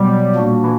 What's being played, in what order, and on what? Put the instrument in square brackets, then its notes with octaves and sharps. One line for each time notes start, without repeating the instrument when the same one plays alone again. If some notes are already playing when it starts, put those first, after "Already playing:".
Already playing: [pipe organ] B2 F#3 B3 [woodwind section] G3
[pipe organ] A#2 A#3 D4 F#4
[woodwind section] E3